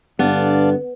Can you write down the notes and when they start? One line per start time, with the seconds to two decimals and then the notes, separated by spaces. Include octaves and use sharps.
0.19 G2 D3 B3 D5 F5 A5